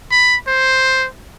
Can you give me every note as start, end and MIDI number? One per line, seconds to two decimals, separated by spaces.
0.11 0.36 83
0.47 1.07 72